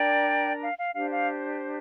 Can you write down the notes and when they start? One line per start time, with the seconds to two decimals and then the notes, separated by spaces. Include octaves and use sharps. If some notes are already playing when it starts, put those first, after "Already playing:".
Already playing: D4 A#4 D5 G5
0.62 F5
0.79 F5
0.95 D4 G4 C5 F5
1.11 F5